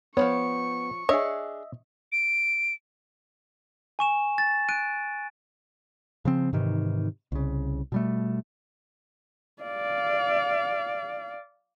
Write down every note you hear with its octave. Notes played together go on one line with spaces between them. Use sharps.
F3 F#3 B3 C#5 C#6
D4 G#4 C#5 D#5 E5
D7
G#5 C#6 E7
A6
F#6 D7 D#7
C#3 F3 C4
G#2 C3 D#3 E3
C2 C#3
B2 G3 A3
D5 F5